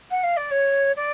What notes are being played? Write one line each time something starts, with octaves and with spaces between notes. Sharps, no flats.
F#5
F5
D5
C#5
D5